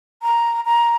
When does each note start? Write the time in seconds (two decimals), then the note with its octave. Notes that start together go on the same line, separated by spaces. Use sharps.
0.22 A#5
0.65 A#5